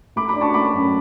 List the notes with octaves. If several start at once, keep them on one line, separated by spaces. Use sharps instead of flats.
A3 B5 D6
B5 D6
D4
A5 C#6
A3 B5 D6
F#2